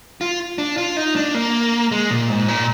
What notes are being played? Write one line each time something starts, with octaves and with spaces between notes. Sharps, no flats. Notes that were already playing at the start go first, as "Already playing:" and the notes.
F4
D4
F4
D#4
D4
A#3
G#3
A#2
G#2
A#2